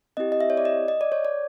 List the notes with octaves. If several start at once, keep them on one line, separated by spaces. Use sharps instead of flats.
C4 E4 G4 D#5
D#5
E5
C#5
D5
D#5
D#5
D5
C#5
D5